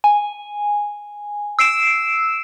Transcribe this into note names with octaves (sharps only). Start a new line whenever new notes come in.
G#5
E6 C7 D7 E7